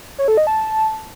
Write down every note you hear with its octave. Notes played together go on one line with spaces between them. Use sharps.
C#5
A4
D#5
A5